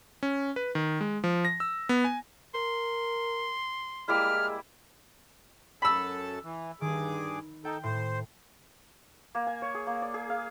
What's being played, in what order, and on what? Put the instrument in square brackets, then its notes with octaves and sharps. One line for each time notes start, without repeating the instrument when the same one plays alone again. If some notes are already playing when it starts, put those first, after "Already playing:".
[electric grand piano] C#4
B4
D#3
G#3
F3
A#6
E6
B3
G#5
[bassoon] A#4 [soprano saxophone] C6
[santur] G3 A#3 E4 [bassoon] G#3 [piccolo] F6
[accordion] F#2 A4 A5 [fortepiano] B5 E6
[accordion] E3
[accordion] G2 G#4 D6 [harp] D#3
[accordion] D#4 A4 [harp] G5
[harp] A2 [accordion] C5
[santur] A#3
G#5
C#5
G#4
A#3
D5
G#4
F5